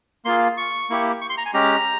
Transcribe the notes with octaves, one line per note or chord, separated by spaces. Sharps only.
A#3 F4 G#4 C6
C#6
A#3 E4 G4
C#6
C6
A#5
G#5
G#3 C#4 G4 A#5